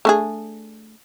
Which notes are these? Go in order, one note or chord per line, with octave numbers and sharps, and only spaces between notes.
A3 D4 G#4